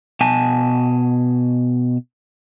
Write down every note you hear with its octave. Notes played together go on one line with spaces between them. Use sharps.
B2 G#5 A5